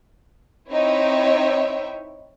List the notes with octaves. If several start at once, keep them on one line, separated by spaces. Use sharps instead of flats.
C4 D#4 E4 C#5 E5 G5